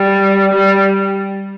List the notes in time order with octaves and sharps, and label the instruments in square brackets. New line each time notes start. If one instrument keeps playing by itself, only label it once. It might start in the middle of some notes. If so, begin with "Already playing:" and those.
Already playing: [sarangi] G3
G3